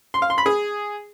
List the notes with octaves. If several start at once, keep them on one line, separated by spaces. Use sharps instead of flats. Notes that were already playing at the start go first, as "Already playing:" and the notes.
C6
F5
C6
B5
G#4